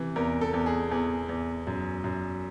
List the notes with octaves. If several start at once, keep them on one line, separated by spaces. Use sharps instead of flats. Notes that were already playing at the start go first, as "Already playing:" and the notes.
Already playing: C3 E3
E2 A#4
A4
E2
G#4
E2 G#4
E2
F#2
F#2